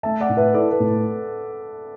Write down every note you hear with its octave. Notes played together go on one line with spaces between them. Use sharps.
A3 E5 A5
D5 F#5
A2
B4 E5
E4 A4 D5
B4
A2